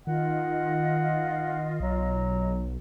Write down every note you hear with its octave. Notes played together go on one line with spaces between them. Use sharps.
D#3 F4 D#5 F#5
B1 F#3